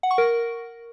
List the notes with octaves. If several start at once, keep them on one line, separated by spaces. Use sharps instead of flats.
F#5
C#6
A#4